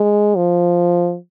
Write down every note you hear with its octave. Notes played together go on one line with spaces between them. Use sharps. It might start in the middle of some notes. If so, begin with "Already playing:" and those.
Already playing: G#3
F3